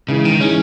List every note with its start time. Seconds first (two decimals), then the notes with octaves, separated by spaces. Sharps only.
0.08 C#3 E3 G#3
0.24 G#2 D#3
0.40 E3 G#3 C#4